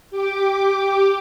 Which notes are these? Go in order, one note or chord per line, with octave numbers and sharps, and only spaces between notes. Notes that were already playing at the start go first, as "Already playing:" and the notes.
G4 D6